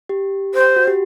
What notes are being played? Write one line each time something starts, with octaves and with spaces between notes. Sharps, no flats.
G4
C5
F#4
G4